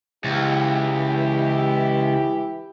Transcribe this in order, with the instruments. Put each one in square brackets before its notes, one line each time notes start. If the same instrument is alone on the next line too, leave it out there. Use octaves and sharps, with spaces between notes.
[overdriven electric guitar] C#2 [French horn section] E3 E4 G4